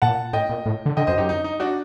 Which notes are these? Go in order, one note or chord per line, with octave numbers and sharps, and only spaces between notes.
A#2 F#5 A5
A2 D#5 G5
A#2
A2
D3
D3 D#5 G5
F#2 C5 D#5
F#2 D#4 G4
D#4
D#4
D4 F#4